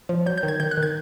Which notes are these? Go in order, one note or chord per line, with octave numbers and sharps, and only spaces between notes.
F3
F#3 G6
G6
D#3
G#6
D#3 G6
F#6
D#3
G#6